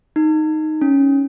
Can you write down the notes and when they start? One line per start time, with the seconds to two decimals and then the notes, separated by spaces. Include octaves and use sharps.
0.16 D#4
0.81 C#4